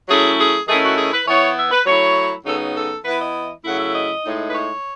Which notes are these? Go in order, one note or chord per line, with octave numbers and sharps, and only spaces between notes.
F#3 A3 C#4 E4 G#4
G#4
D#3 A3 C#4 E4 G#4
F#4
G#4
B4
E3 B3 E4 C#5
E5
B4
F#3 A3 E4 C#5
C#3 F#3 B3 D#4 A4
A4
E3 B3 E4 B4
D#5
C#3 F#3 A3 E4 F#5
E5
D#5
A2 G#3 D#4
B4
C#5